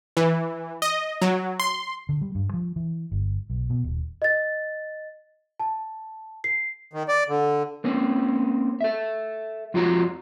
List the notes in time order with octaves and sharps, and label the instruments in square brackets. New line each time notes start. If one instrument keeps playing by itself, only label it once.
[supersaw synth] E3
D#5
F#3
C6
[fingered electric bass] D3
G3
G2
F3
E3
G1
B1
B2
D#1
[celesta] D#5 A6
A5
C7
[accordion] D#3
D5
D3
[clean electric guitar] A#3 C4 C#4
A4 E5
F2 F4 F#4 C#5 A#5